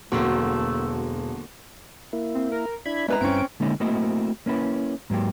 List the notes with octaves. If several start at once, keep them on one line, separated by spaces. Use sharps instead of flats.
E1 D3 F#3 A3 A#3 C4 F#4
A#3 E4
C4
A#4
D4 E4 B5 G#6
G#3 B3 D4 E4 A#4 B4 A#5
G2 C4 C#4 D7
D3 G#3 A#3 C#4 D#4 E4
A3 A#3 C4 E4 F#4 D#5
A#3 C#4 E4 B4
G#2 F#3 A#3 G4